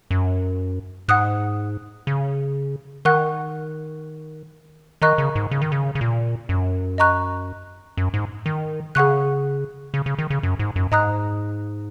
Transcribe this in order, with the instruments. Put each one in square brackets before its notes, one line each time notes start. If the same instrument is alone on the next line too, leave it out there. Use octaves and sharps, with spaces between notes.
[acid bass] F#2
[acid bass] G#2 [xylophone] F#5 D#6 F#6
[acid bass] C#3
[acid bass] D#3 [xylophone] A#4 F#5 C#6 F#6
[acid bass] D#3 [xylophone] A#4 D#5 A#5 C#6 F#6
[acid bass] C#3
G#2
C#3
D#3
C#3
C#3
A#2
F#2
[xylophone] D#5 A#5 C#6 F#6
[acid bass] F#2
G#2
D#3
[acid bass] C#3 [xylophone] G#4 F#5 C#6 F#6
[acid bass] C#3
C#3
D#3
C#3
F#2
G#2
F#2
[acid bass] G#2 [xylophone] D#5 A#5 D#6 F#6